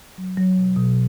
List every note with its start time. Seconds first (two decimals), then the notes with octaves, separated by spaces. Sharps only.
0.18 F#3
0.37 F#3
0.58 B2
0.77 B2